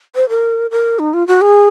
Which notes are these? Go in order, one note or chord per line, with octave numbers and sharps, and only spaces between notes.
C5
A#4
A#4
D#4
F4
F#4
G#4